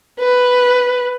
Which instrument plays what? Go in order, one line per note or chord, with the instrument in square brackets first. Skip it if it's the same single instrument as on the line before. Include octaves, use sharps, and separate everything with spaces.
[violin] B4